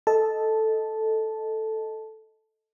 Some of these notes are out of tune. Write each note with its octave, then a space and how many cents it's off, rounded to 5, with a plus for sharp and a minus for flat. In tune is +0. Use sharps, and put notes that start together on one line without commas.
A4 +0 D#5 +5 A5 -5